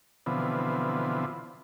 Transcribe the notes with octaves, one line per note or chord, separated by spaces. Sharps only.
B2 D3 E3 F3 B3 C4